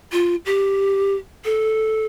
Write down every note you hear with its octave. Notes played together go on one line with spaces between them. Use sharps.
F4
G4
A4